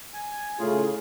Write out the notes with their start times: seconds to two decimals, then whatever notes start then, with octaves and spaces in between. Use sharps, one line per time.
0.14 G#5
0.59 A2 C#3 F4 G#4